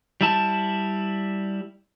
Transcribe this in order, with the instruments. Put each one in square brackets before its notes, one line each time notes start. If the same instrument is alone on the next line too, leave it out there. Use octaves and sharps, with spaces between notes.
[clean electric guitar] G3 E4 A5